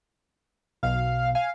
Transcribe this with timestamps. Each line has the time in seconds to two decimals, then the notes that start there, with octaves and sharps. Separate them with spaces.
0.83 B1 B2 F5
1.35 F5 G#5